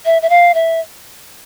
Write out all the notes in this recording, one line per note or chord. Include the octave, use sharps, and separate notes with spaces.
E5
E5
F5
E5